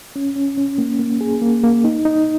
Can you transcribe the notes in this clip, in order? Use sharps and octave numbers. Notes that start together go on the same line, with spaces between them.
C#4
C#4
C#4
A#3
A#3
G#4
A#3
A#3
D#4
D#4